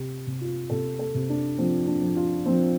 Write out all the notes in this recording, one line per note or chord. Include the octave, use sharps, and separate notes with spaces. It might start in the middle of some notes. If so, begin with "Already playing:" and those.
Already playing: C3 G4
C3
F4
C3 A4
A4
C3
D4
F3 C4
D4
F3
F4
F3 C4